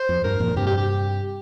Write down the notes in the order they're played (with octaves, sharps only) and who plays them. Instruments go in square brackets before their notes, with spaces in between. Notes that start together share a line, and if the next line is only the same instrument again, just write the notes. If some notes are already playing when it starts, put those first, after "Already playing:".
Already playing: [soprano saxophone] C5
[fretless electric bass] F2
[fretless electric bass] G2 [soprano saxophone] A#4
[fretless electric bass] F2 A#2
[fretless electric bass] G2 C3 [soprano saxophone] G4
[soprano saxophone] G4
G4